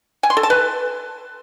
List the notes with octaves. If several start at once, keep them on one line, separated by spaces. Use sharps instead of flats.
G#5
C6
A4
A5
B4